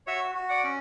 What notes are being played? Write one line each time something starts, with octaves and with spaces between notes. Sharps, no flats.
F#4 C#5 E5
F#4
D5 F#5
C#4